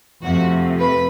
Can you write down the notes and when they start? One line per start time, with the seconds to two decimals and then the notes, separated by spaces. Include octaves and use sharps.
0.22 F2 C3 F3 A3 F#4
0.79 B4